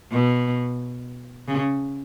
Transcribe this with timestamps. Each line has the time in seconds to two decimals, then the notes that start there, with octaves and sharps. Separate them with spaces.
0.11 B2
1.48 C#3